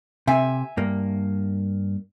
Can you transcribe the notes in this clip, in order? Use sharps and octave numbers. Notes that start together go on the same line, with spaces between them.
C3 E5 G#5
G2 A#3